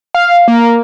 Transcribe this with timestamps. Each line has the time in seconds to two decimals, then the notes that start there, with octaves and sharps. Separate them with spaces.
0.14 F5
0.48 A#3